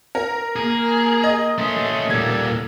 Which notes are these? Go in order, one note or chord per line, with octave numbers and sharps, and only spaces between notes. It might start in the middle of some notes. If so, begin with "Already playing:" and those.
A#4
A#3 G#4
D#5
A3 C#4 C6
A#2 G3 A4 G#6